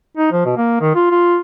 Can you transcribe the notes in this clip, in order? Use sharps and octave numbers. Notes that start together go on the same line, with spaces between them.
D#4
F3
B2
A#3
D#3
F4
F4